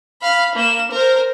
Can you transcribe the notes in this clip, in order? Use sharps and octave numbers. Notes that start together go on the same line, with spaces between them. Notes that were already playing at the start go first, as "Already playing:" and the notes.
F5 B5
A#3 E7
A#4 C5